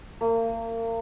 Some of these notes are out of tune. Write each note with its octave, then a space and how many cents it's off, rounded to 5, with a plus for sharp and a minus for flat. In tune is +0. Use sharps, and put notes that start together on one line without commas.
A#3 -35